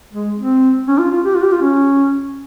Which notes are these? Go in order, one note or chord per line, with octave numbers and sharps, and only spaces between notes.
G#3
C4
C#4
F4
F4
G4
F4
G4
F4
C#4